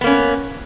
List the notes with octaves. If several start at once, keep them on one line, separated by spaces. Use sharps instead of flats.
A#3 B3 C#4